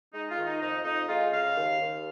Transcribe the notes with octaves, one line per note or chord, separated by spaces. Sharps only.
G#3 D#4
F4
D#3
D#4
F2 D#4
F2 D#4
G#3 F4
C#3 F5
D#2
D#2